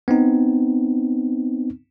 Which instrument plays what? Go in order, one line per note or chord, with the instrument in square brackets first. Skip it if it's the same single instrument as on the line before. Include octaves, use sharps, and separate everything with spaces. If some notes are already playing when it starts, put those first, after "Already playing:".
[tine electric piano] B3 C4 D#4